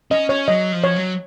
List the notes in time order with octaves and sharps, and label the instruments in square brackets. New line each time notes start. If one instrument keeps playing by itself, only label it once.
[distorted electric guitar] C#4 [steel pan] D#5
[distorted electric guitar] C#4 [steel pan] C#5
[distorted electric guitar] F#3 [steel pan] D#5
[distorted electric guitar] F3
[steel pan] C#5
[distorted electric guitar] F#3